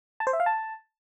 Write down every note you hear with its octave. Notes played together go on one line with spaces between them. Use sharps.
A5
C5
E5
F5
A5